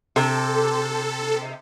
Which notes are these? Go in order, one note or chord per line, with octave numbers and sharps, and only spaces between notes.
C3 A4